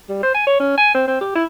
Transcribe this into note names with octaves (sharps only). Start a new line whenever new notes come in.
G3
C5
G#5
C#5
C#4
G#5
C4
C4
G4
E4